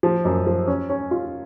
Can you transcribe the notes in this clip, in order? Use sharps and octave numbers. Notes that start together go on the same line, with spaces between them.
F3
F#2
F3
C#4
C#4
F4